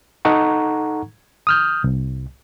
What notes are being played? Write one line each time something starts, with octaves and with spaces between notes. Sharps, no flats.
D#4 A4 F#5 A#5 C#6
D#6 F6 G6
C2